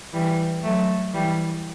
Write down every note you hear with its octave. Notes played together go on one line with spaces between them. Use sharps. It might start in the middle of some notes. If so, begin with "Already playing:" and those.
E3 G3
F#3 A3
E3 G3